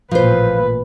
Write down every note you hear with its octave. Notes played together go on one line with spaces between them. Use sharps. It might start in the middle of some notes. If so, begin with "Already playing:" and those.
A1 A#2 F3 B4 C5